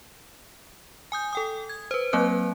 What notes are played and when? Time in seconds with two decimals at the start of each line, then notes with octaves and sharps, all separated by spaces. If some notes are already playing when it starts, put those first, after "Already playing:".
1.12 G#5 D#6 G6
1.33 A4 G5 D#6
1.69 G#6
1.91 B4 C5
2.13 F#3 A#3 C4 B4 F#6